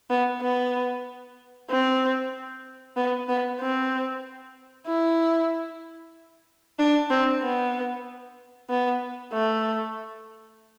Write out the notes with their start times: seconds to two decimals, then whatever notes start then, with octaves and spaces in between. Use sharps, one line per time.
0.10 B3
0.42 B3
1.69 C4
2.97 B3
3.29 B3
3.60 C4
4.87 E4
6.79 D4
7.10 C4
7.42 B3
8.70 B3
9.33 A3